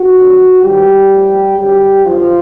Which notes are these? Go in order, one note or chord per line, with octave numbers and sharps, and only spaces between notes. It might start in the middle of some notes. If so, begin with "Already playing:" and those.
Already playing: F#4
F2 D3 F#3
G#2 D#3 F#3 G3 G4
A2 F3
F#2 D3 F#3 G3 G4
F#2 D3 F3 G3 F4